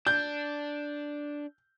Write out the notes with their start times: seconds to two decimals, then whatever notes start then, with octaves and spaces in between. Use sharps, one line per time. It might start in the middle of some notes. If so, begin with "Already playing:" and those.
0.07 D4 G6